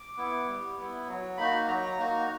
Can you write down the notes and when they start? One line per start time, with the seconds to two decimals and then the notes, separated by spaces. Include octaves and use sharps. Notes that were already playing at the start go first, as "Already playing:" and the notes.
Already playing: D6
0.17 B3 E4
0.48 G3
0.78 B3 E4
1.08 F#3
1.37 A#3 D#4 F#4 B5
1.68 F#3 A#5
1.98 A#3 D#4 F#4